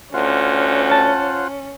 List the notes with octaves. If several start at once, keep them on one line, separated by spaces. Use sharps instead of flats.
D2 C#4 F4 C5 F#5
A5